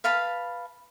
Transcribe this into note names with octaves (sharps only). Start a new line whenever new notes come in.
B4 F5 A5 B5